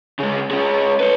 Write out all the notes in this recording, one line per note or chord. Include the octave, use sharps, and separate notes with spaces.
C#3 G#3
G#3 C#4
B4 C#5